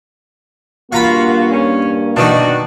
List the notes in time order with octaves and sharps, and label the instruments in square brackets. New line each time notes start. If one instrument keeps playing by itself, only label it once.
[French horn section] G2 A#3 [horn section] F4 F#4 [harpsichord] F5 A#5 B5
[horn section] C#4
[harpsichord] B2 D#3 D#4 [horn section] D4 F#4